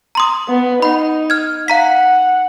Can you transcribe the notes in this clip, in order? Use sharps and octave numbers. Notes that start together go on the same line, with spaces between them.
A#5 C6 D#6
B3
D#4 F#5 B5
F6 G#6
F5 F#5 A#5 B6